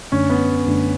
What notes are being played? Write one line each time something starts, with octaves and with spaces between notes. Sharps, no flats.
F#2 D3 A3 C#4 D4
B3
F#2 D3 A3 D4